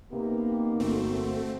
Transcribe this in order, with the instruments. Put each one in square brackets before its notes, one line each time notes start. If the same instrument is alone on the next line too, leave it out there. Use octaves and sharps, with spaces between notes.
[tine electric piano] C3 [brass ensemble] A#3 [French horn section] B3 D#4 G4
[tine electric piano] G1 F#4 [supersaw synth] A3 C4